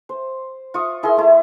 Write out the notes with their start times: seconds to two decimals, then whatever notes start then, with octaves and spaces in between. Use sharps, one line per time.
0.09 C5
0.74 F4 C#6 D#6
1.03 E4 G#4 A#4 C6
1.17 A3 E4